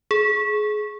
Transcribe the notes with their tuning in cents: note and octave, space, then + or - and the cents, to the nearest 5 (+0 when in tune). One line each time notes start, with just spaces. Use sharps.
G#4 +25